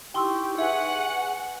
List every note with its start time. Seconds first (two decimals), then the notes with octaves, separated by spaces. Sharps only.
0.14 D#4 E4 G4 G5 C6 C#6 E6
0.58 G#4 B4 E5 F#5 G#5 C#6